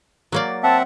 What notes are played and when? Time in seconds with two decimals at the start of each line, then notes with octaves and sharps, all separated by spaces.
0.32 F#3 A#3 D5
0.63 C4 E5 F#5 A5